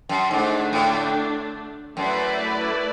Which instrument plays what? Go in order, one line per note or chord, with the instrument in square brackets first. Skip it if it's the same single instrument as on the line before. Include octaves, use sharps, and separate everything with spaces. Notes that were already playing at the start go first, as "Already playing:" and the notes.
[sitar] F#2
[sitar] G#2 [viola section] D3 A3 D4
[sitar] A2
[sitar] F#2 [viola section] A3 E4 B4 D5